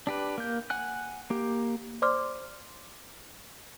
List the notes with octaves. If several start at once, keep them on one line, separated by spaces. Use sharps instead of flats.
D4 G4 B4
A#3 G6
F#5 G#5 F#6
A#3 G4
C5 D5 C6 D6 F6